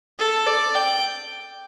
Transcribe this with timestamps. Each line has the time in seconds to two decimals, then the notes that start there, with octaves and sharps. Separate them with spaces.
0.19 A4
0.47 D5
0.75 G5